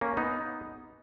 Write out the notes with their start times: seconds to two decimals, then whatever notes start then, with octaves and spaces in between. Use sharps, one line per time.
0.01 A#3 C#4
0.17 B3 D#4